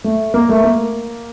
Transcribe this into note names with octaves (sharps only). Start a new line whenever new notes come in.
A3
A#3
A3
A#3